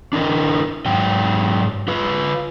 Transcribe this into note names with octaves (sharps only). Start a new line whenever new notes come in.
D4 E4 A#4 D#5
G#2 F#3 G5
F4 B4